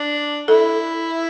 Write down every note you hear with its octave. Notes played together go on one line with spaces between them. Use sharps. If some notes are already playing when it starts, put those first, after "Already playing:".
Already playing: D4
E4 A4